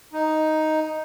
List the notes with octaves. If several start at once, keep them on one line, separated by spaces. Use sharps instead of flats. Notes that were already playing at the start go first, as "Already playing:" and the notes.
D#4